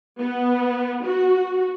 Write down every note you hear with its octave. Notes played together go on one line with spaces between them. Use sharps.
B3
F#4